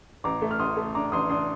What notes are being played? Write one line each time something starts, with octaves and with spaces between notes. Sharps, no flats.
A1 A#5 D6
A3
F6
A1 C6 D#6
A3
D4 A#5 D6
A1 C6 D#6
D4 C6 D#6